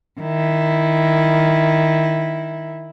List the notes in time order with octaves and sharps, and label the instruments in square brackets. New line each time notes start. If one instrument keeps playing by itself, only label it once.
[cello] D#3 E4